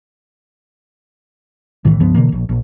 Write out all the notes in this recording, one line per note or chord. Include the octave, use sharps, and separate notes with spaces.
B1 A2 D#3 E3
C#2 G2 F3 B3
B2 D3 E3 A#3
A#1
A#1